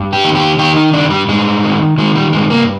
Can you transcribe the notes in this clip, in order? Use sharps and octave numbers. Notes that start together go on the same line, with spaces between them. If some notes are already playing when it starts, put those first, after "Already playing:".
Already playing: G2
G4
D#3
G4
D#3 G4
D#4
G2 D4
G3
G2 G#3
D#3
D#3 G#3
G3
G2 G#3
A#3